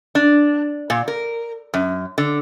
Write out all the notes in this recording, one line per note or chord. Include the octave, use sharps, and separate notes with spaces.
D4
A#2
A#4
F#2
D3